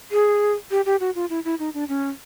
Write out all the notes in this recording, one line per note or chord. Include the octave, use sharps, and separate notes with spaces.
G#4
G4
G4
F#4
F4
E4
E4
D#4
D4
C#4